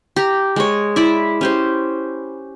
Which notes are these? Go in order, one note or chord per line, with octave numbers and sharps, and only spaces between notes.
G4 A#5
G#3 C#5
E4 D5 E5
C#4 G4 C5